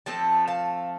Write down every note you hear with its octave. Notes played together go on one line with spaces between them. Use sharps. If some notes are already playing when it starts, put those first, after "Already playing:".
F3 A3 C4 A5
F5 A5